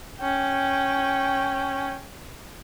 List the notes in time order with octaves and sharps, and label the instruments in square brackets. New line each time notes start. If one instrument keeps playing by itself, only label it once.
[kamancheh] C#4 G5